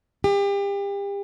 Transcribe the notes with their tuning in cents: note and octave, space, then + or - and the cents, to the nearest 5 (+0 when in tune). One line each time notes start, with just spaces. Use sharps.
G4 +35